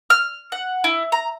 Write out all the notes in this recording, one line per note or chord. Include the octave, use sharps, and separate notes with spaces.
F6
F#5
E4
A#5